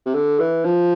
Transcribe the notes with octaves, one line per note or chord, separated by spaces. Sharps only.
C3
D3
E3
F3